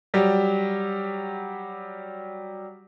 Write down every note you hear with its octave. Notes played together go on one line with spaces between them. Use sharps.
F#3 G3 G4